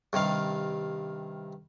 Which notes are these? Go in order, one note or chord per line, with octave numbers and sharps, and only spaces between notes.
G2 C3 D#3 F5